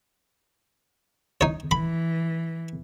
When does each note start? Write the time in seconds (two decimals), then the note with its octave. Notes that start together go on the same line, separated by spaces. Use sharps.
1.41 D#4 C#5
1.71 E3 B5